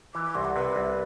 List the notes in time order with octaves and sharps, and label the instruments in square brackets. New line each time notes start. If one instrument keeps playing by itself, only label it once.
[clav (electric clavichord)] E3 [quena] D6
[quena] D6
[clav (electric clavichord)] C2 [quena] C6
[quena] F#5
[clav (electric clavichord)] C3 [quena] B4
[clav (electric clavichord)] C2